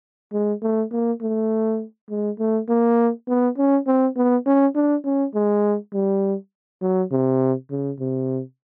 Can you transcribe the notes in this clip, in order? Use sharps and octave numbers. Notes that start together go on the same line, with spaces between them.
G#3
A3
A#3
A3
G#3
A3
A#3
B3
C#4
C4
B3
C#4
D4
C#4
G#3
G3
F#3
C3
C#3
C3